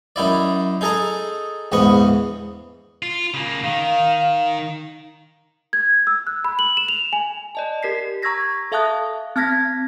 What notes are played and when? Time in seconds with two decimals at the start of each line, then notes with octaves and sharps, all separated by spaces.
0.16 F#2 D#4 E4 D5
0.81 D#4 G#4 A4 D#5 A#5
1.72 A#1 E2 G#2 B3 D#5 C#6
3.02 F4
3.34 C#3 A#3
3.64 D#3 F5
5.73 G#6
6.07 E6
6.27 F#6
6.45 B5
6.59 F#7
6.77 E7
6.89 F7
7.13 G#5
7.55 D5 D#5 A5
7.83 G4 A#4 B6 C7
8.22 A#5 C#6 E6 G#6 A#6 B6
8.72 A4 E5 F5 A5 D#6 F#6
9.36 C4 A5 F6 G#6 A#6 B6